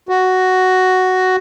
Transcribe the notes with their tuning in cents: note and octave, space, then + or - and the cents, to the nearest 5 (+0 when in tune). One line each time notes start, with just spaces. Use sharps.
F#4 +5